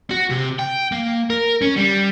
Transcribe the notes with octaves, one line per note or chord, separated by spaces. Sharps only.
F#4
C3
G5
A#3
A#4
C#4
G3